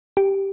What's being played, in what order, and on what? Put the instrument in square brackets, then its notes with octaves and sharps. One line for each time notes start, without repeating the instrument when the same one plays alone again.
[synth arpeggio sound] G4